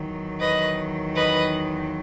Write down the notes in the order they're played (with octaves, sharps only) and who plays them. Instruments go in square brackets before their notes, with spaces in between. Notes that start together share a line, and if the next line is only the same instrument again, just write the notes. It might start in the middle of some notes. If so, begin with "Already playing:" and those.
Already playing: [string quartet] E2 D#3 F#3
B4 D#5
B4 D#5